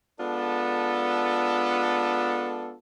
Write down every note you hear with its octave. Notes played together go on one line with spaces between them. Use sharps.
G#3 B3 D4 F4 A4